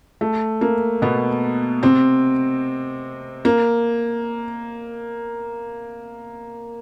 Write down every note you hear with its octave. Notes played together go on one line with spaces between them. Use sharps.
A3
A#3
B2 B3
C3 C4
A#3